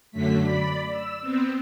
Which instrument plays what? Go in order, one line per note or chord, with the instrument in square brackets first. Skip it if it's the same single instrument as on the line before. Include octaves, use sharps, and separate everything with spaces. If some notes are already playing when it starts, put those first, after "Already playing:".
[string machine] F#2 D3 F#3 A3 B6
D5 B5
E6
B3 C4